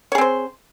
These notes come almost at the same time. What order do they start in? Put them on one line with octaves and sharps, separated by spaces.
C#5 G#4 C4 C5